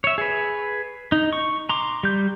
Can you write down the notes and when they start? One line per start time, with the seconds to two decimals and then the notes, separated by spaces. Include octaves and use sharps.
0.04 C#5 E5
0.18 G#4 B4
1.12 D#4
1.33 C#6
1.69 A#5 C6 D6
2.03 G3 G6